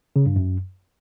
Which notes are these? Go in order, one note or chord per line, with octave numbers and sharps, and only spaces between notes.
C#3
G2
F#2